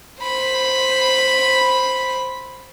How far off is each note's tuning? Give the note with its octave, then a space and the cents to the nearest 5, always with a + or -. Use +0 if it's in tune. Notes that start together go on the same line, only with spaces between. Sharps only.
C5 +0 B5 +0